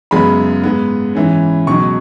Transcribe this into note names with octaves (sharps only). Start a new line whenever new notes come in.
F#2 C#3 G#3 B3 B5
G#2 G#3 B3
G#2 E3 C#4
C#2 B2 F#3 C#6